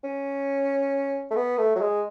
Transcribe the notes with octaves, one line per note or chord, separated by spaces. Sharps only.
C#4
A3
B3
A3
F#3
G#3